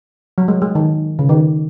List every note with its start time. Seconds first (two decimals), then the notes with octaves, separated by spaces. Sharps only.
0.38 F#3
0.48 G#3
0.62 G#3
0.75 D#3
1.19 C#3
1.29 D#3